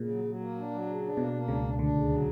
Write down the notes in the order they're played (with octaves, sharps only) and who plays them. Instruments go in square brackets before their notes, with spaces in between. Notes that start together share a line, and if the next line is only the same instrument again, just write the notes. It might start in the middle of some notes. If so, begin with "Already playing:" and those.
Already playing: [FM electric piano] A#2 [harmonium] C#3
[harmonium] F#3
F#3
A#3
D4
F#3
C#3
D4
[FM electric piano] B2 [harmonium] A#3
[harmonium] A#3
[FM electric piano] C#2 C#3 [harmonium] D4
[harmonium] D4
[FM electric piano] D2 D3 [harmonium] D4
[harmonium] C#3
F#3